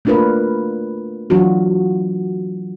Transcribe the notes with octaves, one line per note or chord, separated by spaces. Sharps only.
A3 A#3 D4 F4 A#4 B4
E3 F#3 D4 F4 F#4